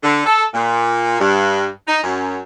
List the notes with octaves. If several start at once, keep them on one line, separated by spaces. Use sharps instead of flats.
D3
A4
A#2
G2
D#4
F#2